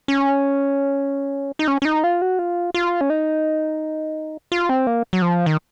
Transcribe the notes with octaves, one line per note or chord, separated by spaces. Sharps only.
C#4
D#4
C#4
C#4
D#4
F4
F#4
F4
F4
C#4
D#4
F4
C4
A#3
F#3
F3
D#3